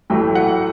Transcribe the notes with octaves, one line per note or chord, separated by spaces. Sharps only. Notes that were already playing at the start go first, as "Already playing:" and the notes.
A1 A2 F#3 A3 G5
F#5